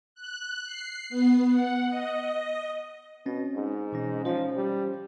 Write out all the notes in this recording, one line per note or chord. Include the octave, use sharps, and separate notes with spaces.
F#6
C7
B3
F#5
D#5
B2 C4 C#4
G#2
B2 E3 C#4
F3 C#4 F4 C5
G3